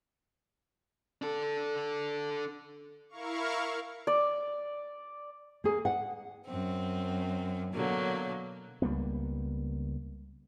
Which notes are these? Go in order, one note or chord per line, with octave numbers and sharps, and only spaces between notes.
D4 A4
E4 A#4 F5 C#6
D5
A#3 G#4 A#4
F#5
F#2 C4
B2 D3 F#3 A#3
C#2 G3 A#3 B3